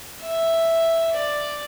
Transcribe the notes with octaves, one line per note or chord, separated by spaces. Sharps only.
E5
D5